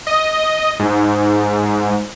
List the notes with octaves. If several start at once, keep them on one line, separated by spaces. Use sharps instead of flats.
D#5
G#2